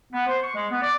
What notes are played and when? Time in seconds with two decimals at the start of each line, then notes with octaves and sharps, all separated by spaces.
0.13 B3
0.27 C5
0.43 C#6
0.55 G#3
0.70 B3
0.82 D5